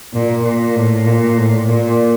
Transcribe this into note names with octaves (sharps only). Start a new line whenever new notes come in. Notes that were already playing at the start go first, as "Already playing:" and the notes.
A#2
A#2
A2
A#2
A2
A#2